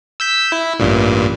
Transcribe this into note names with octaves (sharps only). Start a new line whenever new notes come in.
E6 G6 B6
E4
A1 G2 A#2